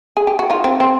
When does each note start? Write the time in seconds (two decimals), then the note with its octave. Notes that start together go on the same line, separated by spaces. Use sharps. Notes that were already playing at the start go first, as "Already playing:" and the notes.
0.17 G#4
0.27 G4
0.39 F#4
0.50 D#4 F4
0.64 C4
0.80 C4